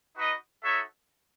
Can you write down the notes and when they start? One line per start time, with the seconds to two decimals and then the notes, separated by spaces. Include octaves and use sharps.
0.16 D#4 F#4 B4 D#5
0.64 D#4 F#4 A4 C#5 E5